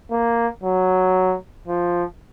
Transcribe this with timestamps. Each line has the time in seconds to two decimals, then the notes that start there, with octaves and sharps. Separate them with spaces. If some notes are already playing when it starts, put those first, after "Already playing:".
0.11 A#3
0.63 F#3
1.68 F3